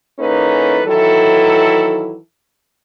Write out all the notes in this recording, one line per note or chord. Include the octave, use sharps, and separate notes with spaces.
E3 A#3 C#4 D#4 A4 B4
D#3 E3 F#3 E4 A4